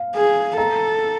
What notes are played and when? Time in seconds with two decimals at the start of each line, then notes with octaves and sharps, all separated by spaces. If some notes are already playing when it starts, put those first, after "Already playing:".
Already playing: F5
0.15 G#4
0.57 A4 A#5